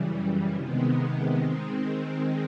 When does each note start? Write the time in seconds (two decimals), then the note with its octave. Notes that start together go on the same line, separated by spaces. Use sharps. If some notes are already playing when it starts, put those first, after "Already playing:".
Already playing: F#2 C#3 E3 G3
0.54 C3 D#3 G#3 B3
1.38 D#3 G#3 C4